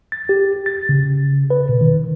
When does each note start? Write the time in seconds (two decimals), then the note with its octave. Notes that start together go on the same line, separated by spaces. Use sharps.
0.12 A6
0.29 G4
0.66 A6
0.89 C#3
1.50 B4
1.69 B2
1.81 D#3